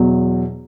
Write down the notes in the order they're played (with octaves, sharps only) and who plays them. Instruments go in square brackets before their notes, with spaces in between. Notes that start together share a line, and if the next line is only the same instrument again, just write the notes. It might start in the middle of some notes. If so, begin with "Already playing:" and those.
Already playing: [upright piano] E2 B2 F#3